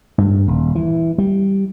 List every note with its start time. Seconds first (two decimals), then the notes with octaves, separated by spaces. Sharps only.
0.18 G2
0.48 D#1
0.75 E3
1.18 G3